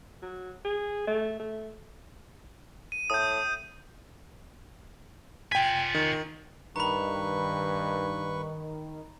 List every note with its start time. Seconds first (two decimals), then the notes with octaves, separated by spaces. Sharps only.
0.22 F#3
0.65 G#4
1.07 A3
1.40 A3
2.92 D#7
3.10 A2 D#6 G6
5.52 F4 G5 G#5 B6
5.95 D#3
6.76 G2 D#3 B4 A#5 B5 C#6